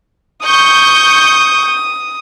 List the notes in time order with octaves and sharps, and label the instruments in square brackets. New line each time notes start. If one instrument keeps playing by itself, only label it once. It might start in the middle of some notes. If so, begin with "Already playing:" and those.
[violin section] C#6 G6 [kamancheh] D#6